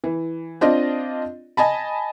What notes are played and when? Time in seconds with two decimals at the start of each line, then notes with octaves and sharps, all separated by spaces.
0.04 E3
0.61 C4 D4 F4 D5 D#5
1.57 D#5 G#5 A5 B5